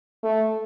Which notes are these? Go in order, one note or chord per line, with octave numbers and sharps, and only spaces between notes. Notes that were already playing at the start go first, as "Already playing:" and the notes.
A3